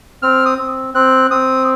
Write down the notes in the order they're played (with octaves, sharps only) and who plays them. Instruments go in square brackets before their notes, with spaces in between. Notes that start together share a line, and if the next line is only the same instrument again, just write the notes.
[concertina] C4 F6
D#6
C4
C4 F#6
C4 D#6